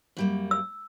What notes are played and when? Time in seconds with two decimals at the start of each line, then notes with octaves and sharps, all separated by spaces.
0.17 F#2 G3 A#3
0.51 E6